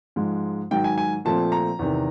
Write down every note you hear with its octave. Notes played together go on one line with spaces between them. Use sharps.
G#2 F3 G#3
G#2 D#3 F#3 G5
G#5
G#5
A#2 F3 A3 C4 A5
A#5
E2 C3 D#3